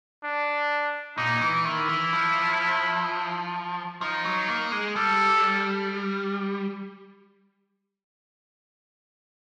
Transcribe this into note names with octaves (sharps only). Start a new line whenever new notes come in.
D4
A#2 D#4
E3
D#3 E4
E3
F3
F3 D#4
F#3
A#3
G#3
G3 A4